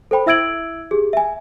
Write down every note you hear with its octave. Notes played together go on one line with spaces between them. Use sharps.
A4 C5 G5 B5
E4 E5 E6 G#6 D7 F#7
G4 G#4
E5 G#5